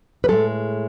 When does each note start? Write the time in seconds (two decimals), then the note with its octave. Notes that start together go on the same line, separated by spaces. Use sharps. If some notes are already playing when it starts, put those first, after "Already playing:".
0.24 B4
0.28 A2 G#3 A4